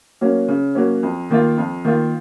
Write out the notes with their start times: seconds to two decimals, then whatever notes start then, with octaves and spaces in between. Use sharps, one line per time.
0.21 F#3 A#3 C#4
0.48 C#3
0.75 F#3 A#3 C#4
1.03 F2
1.30 D#3 A#3 F4
1.57 F2
1.85 D#3 A#3 F4